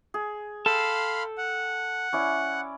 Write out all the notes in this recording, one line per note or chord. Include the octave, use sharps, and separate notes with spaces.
G#4
A4 F5 G5 B5 C6
F#5
C#4 E4 D5